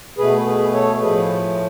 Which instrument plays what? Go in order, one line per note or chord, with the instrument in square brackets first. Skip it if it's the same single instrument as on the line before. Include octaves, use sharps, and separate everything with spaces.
[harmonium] B2 A3 G#4 B4
G#4 B4
A4 C#5
A2 F3 A3 G#4 B4